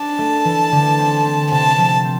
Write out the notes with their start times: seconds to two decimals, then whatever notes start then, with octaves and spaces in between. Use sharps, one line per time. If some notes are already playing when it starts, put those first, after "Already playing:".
Already playing: D4 A5
0.18 A3
0.45 E3
0.72 D3
0.99 C4
1.25 C4
1.51 C3 A5
1.78 F3
2.04 C4